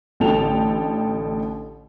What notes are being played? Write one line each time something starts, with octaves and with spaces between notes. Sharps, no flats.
A1 D3 A4 G5 A5 F7